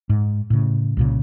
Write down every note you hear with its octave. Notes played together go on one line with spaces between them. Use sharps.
G#2
A2 C#3
C2 A#2 C#3